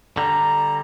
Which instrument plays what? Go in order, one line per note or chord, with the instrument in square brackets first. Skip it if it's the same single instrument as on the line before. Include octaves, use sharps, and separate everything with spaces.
[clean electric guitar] D3 G3 [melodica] A#5